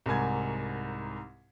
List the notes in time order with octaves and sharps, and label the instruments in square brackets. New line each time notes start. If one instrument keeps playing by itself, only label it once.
[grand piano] C2 G#2 A#4 G#5 G#6